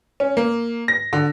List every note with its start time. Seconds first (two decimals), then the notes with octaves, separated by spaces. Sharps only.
0.20 C#4
0.37 A#3
0.88 A#6
1.13 D3